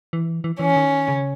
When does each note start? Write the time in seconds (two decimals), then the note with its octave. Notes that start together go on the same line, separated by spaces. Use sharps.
0.13 E3
0.44 E3
0.59 E3 C#4
0.76 D#3
1.08 C#3